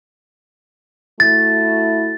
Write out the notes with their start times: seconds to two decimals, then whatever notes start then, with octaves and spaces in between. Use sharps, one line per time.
1.20 A3 E4 F#4 A6